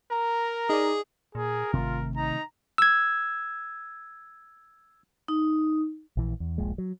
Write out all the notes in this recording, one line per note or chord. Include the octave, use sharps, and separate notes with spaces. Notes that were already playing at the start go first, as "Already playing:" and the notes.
A#4 A#5
D#4 G#4 D5
A#2 G#4 A#4
G#1 C3 D#3 A3 F4
D#4 A#5
E6 G#6
D#4
A#1 E3
E2
D#1 A#1 A#2 G#3
F#3